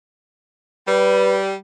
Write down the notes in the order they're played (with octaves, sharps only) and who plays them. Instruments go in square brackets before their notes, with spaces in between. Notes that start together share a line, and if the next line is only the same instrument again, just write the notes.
[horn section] G3 [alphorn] B4